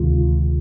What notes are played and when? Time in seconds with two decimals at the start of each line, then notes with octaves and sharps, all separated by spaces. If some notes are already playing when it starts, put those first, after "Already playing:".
Already playing: D2 C3 D#3 G#3 F4